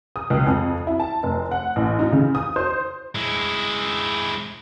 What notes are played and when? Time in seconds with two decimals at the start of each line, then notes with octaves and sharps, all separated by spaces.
0.16 D#6
0.30 C#2
0.47 F2
0.87 E4
1.00 A5
1.23 F1
1.51 F#5
1.76 A1
1.99 D#4
2.12 C#3
2.35 D#6
2.56 C5
3.15 G#3 E4